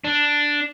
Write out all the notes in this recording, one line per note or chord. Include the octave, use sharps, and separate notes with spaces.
D4